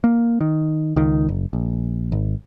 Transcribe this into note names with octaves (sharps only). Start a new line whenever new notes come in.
A#3
D#3
C#2 D#3
F#1
A#1
G#1